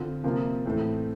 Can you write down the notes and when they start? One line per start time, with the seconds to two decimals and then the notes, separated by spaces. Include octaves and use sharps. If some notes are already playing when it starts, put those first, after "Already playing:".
Already playing: D3 C4 F4
0.24 C3 F3 A#3 F4
0.66 A2 E3 A3 C4